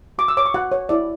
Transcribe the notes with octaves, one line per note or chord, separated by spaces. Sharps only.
F#4 D6
E6
C#5 D6
C#6
F#4 F#5
C#5
E4 D5